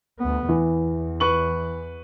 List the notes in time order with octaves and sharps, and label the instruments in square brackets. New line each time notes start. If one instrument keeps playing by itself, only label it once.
[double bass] D2 B3
[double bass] E2 [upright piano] E3
[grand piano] B4 C#6 F#7